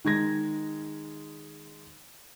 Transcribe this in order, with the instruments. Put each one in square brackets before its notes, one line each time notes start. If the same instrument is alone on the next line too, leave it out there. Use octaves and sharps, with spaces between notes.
[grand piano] D#3 G#3 G#6 A#6